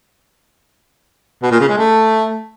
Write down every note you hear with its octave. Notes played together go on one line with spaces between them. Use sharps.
B2
A#2
C#3
G#3
A3